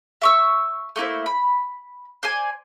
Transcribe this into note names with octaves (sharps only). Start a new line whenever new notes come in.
E5 C#6 E6
A3 A#3 E4 C5
B5
C5 D5 G#5